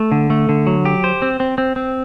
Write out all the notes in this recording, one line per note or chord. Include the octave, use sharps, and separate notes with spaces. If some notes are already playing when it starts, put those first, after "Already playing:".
Already playing: A3
D3
A3
D3
F#3
G4
C5
C4
C4
C4
C4